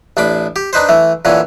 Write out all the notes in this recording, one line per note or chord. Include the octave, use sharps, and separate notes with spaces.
A1 D4 B5 D6
G4
D4 D#4 B4 C5
E3 A3
A#2 D3 E3 C#4